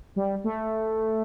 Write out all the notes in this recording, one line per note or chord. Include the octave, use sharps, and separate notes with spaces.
G3
A3